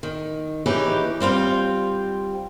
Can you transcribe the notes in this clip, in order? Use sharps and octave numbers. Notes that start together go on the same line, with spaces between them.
D#3
E3 C#4 D#4 G4 G#4 B4
G3 C4 F4 G5